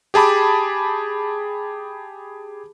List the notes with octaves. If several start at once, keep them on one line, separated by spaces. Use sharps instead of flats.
G4 G#4 A5 B5 D6